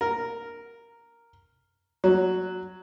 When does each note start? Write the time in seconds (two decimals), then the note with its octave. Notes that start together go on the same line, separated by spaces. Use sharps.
0.01 A#4
2.04 F#3